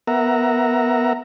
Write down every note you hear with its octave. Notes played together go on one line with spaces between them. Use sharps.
B3 A#4 E5 F#5 A#5